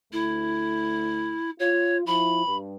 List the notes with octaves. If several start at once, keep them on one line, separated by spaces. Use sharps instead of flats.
D2 A3 E4
F4 C#5
F3 E4 B5
G2